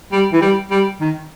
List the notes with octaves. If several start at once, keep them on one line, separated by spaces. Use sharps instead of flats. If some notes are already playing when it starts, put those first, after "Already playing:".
G3
E3
G3
G3
D#3